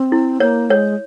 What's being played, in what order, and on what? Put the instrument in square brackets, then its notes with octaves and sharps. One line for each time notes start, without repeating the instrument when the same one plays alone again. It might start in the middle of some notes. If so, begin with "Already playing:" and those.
Already playing: [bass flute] C4
[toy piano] E4
[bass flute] A#3 [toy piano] C#5
[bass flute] G#3 [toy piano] C#5